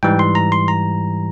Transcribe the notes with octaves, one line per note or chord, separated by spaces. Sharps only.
G#2 E3 G3 G5
C6
A#5
C6
A#5